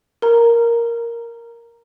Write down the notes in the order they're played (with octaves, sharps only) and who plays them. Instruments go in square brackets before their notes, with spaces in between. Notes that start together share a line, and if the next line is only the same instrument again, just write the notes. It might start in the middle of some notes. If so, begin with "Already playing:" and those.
[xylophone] A#4 A#5